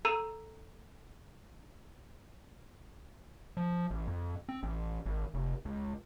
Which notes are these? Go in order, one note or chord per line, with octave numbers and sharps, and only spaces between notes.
A4 A#5 E6 D#7
F3
A1
F2
C4
A1
G#1
F1
C#2